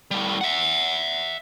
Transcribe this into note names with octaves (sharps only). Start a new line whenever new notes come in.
A2 G3
E5 F#5